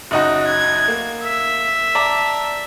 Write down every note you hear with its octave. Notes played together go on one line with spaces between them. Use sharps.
F#1 D#4 F#4
G#6
A#3
E5
D5 A5 A#5